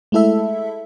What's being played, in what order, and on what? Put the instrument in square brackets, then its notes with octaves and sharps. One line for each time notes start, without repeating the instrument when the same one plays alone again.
[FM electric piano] G#3 A3 E4 A4 E5